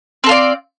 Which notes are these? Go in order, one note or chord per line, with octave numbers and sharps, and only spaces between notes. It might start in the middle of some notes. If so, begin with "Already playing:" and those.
C4 F4 A4 D5